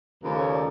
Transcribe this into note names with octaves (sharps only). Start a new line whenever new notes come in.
D#2 C#3 F3 A3 B4
C#5
D5